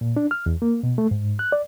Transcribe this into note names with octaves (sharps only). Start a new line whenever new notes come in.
A#2
D4
F6
E2
A#3
B2
A3
G#2
F#6
D5